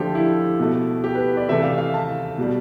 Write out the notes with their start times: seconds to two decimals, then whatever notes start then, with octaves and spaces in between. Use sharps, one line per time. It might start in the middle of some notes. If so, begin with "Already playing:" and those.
Already playing: D3 F3 A3 G4 A4
0.15 E4
0.60 B2 A3
1.04 G4
1.15 B4
1.37 D5
1.49 C3 E3 A3 E5
1.63 F5
1.78 F5
1.94 A5
2.38 B2 G3